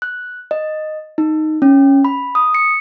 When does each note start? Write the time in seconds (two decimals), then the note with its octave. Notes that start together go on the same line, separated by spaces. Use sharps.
0.02 F#6
0.51 D#5
1.18 D#4
1.62 C#4
2.05 B5
2.35 D#6
2.55 C#7